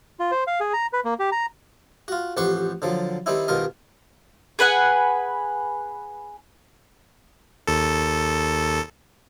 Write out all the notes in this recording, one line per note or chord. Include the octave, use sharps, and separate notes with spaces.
F4
C5
F5
G#4
A#5
B4
A#3
G4
A#5
F4 F#4
A1 F2 G4 C5 F#5 C#6
D3 F3 F#3
D#3 G3 C4 D#4 E4
C2 B2 D#3 F4 A#4 D#5
G#4 B4 F#5 G#5
D#2 A4